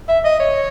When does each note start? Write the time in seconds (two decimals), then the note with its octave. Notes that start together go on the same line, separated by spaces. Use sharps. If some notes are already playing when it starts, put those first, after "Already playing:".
0.08 E5
0.24 D#5
0.40 C#5